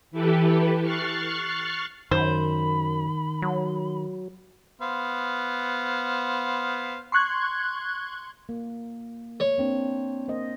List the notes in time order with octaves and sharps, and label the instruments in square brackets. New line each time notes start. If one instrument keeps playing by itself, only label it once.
[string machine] E3 E4 G4 A4 B4
C#6 F6 F#6 A6 C7
[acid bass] F#2 [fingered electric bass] D#3 [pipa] C5 [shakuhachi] B5
[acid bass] F#3
[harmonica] B3 C5 F5
[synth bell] C6 C#6 F#6 G#6
[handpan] A#3
[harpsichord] C#5
[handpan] A#3 C4 D4
A#3 C5 D#5